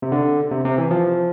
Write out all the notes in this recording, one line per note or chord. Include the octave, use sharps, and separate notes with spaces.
C3
D3
C3
C3
E3
F3